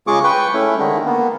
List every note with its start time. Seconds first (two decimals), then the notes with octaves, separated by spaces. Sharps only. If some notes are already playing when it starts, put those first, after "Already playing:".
0.07 C#3 G#3 F4 G#4 C#6 D6
0.24 B4 G5 C#6
0.54 A3 C#4 E4
0.78 D3 D#3 G#3 A3
1.05 A#3 B3